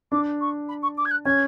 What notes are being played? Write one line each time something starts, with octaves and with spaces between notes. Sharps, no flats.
D4 D6
C#6
B5
C#6
D6
G#6
F#6
C#4 G#6